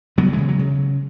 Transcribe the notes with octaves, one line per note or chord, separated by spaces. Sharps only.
C#3 F#3 B3
E3 G#3
C#3
F#3
C#3